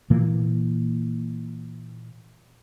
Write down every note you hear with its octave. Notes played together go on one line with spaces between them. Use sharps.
A#2 E3 A#3